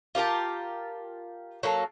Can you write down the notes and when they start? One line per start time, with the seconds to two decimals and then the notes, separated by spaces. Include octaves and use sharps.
0.15 F4 G4 A#4 A5
1.63 F#3 A#3 A4